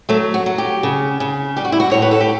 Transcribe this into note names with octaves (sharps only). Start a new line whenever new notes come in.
F#3 A3
F#4
F#3
G4
C#3
C#3
G3 G4
F#4
E4
F#4
A2 C#5
B4
A4
G4